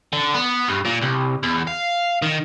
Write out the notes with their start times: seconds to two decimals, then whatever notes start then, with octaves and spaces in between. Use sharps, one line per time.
0.13 D3
0.34 B3
0.68 G2
0.85 A#2
1.01 C2
1.43 E2
1.67 F5
2.22 D#3